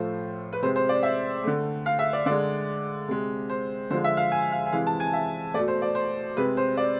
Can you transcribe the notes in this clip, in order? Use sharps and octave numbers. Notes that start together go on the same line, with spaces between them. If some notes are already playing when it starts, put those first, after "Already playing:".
Already playing: A2 F3 A3 C5
B4
C3 G#3 C5
C5
D5
E5
D3 A3
F5
E5
D5
D3 G#3 D5
C3 G#3
C5
D3 F3 G#3 C5
E5
F5
G#5
F5
G#5
C3 E3 G#3 F5
A5
G#5
E5
B2 A3 D5
C5
D5
C5
C3 G#3 B4
C5
D5